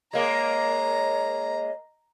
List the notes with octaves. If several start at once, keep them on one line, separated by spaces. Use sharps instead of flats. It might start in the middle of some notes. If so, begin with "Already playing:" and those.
G#3 A#3 C#5 D#5 A#5